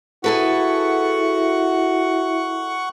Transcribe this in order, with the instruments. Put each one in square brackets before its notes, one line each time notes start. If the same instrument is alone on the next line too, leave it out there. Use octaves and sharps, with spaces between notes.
[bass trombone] E4 [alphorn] F#4 [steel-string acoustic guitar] G#4 A4 B4 [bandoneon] F#5 C#6